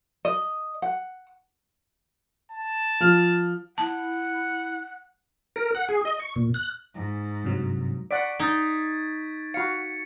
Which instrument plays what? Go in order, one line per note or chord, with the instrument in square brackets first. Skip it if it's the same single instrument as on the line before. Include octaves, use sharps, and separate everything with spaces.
[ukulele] D#5
F#5
[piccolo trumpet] A5
[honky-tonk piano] F3 F6
[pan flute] E4 [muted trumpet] F#5 [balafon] A5
[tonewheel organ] A#4
F#5
G#4
D#5
C#6
A#2
F#6
[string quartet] G#2
[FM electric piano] G2 C3 F#3
[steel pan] D5 F#5 [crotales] C#6 B6 D7
[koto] D#4 [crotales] G#6 A6
[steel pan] F#4 F5 [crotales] C#7